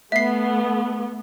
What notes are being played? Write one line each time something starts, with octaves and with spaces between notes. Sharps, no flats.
A3 B3 E5 C7